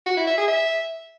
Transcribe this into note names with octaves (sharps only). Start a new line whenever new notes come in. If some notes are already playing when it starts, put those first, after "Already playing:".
F#4
E4
E5
G#4
E5